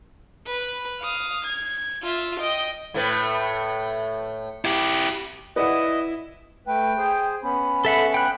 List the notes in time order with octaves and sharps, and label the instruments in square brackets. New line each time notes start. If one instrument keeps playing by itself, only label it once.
[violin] B4
F5 D#6
G#6
F4 E5
D#5 G5
[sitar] A2 A3 B4
[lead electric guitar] E4 G4
[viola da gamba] E4 [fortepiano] B4 D5 F#5 [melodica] D#5
[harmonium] A3 B4 [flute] G5
[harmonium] G#4 C5
[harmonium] B3 C#4 [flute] B5
[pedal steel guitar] A4 E5 F#5
G5 F#6